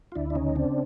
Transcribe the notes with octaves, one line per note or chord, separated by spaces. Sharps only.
F4
D2 D4 E4
D4
C#3 C#4 D#4
C#3 C4 D4